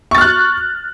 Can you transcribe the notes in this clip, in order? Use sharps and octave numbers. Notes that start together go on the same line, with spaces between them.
C#6 F6 F#6 A6